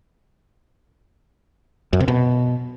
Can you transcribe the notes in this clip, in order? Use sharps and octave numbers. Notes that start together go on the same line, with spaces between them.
F#2
C3
B2